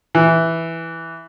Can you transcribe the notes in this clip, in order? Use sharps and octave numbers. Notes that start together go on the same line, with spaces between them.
E3